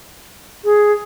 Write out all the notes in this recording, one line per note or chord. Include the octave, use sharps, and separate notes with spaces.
G#4